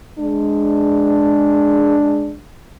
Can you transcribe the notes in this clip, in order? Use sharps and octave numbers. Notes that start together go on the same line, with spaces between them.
G#3 D4